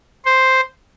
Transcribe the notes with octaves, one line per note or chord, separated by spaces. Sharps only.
C5